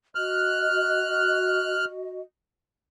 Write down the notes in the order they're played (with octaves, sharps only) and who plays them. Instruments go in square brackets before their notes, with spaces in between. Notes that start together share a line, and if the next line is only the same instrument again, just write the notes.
[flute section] F#4 D#5 [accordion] F6 F#6